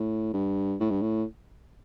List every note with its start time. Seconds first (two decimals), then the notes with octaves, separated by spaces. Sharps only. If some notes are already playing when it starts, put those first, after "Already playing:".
Already playing: A2
0.34 G2
0.80 A2
0.91 G2
1.02 A2